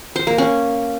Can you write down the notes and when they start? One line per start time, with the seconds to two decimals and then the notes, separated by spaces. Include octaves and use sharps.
0.16 C5
0.27 A#3
0.38 C#4